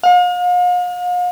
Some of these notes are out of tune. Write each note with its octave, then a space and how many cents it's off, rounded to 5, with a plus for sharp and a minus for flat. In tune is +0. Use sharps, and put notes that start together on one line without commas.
F5 +40